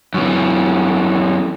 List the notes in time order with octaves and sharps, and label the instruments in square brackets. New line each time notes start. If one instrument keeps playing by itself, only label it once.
[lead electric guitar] F#2 E3